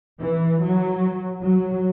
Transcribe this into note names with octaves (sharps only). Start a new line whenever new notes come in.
E3
F#3
F#3